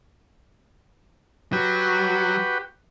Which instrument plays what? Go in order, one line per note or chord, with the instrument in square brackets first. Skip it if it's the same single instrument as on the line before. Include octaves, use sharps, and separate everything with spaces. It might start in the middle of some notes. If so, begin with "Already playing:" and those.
[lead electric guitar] F#3 [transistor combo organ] F#4 G4 B4